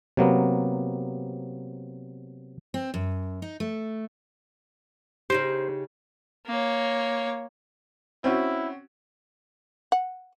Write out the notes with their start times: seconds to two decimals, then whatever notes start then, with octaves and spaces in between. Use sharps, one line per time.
0.17 C3 F#3 A#3 B3
2.74 C4
2.94 F#2
3.42 D#4
3.60 A3
5.30 C#3 D#4 G4 C5
6.46 A#3 C#5
8.24 C4 C#4 E4 F#4
9.92 F#5